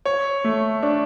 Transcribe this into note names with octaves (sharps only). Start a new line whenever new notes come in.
C#5
A3
D4